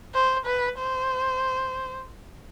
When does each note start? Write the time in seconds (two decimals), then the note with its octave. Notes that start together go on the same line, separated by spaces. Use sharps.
0.14 C5
0.46 B4
0.79 C5